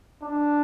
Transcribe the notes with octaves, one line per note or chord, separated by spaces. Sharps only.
D4